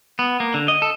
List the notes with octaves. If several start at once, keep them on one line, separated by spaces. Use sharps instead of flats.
B3
A#3
D3
D#5
A4